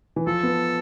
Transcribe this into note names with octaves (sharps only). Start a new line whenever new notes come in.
E3
F3 A4
B3